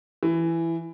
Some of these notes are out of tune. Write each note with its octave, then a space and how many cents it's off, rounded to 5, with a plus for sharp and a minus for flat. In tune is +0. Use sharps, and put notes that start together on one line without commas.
E3 +10